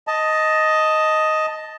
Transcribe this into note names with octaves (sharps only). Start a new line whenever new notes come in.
D#5 A5